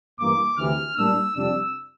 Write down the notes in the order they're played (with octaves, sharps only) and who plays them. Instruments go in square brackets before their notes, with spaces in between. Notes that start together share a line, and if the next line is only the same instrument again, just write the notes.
[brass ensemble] A1 G2 E3 A#3 [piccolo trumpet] D6
[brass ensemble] D2 C3 E3 [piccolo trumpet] F6
[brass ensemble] A2 G3 A#3 D4 [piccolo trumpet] E6
[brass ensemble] F2 C3 G3 D4 [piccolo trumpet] E6